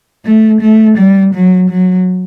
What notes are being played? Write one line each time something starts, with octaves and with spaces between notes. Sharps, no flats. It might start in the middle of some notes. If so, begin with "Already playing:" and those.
A3
A3
G3
F#3
F#3